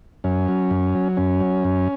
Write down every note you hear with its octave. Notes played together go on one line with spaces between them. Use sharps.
F#2 C#4
F#3
F#2
F#3
F#2 C#4
F#3
F#2